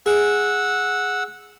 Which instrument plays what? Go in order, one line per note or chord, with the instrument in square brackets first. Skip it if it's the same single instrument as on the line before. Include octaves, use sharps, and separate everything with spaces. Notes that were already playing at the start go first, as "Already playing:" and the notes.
[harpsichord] G#4 [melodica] F#5 E6